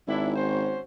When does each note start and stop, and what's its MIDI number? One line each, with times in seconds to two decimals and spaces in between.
0.08 0.79 32
0.08 0.32 62
0.08 0.32 64
0.36 0.81 61
0.36 0.81 66
0.36 0.81 72